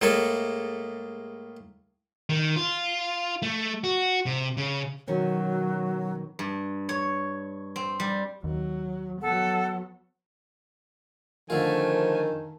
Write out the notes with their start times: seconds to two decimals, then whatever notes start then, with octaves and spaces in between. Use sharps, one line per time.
0.02 A2 G#3 A#3 A4 G#5
2.29 D#3
2.56 F4
3.42 A3
3.84 F#4
4.26 C3
4.57 C#3
5.07 B2 D#3 F#3 C#4
6.39 G2
6.89 C#5
7.76 C4
8.00 G3
8.44 D#2 F#3
9.22 F#3 B3 A4 F#5
11.50 D3 D#3 F3 A3 F4 G#5